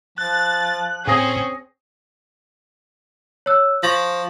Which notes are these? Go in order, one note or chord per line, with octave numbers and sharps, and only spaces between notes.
F3 F#6 A6
A2 C4 C#4 G#4 G#5 D#6 A#6
C#5 E6 F#6
F3 C#6 A#6